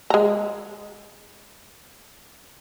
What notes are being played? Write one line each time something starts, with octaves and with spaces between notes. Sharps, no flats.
G#3 A#5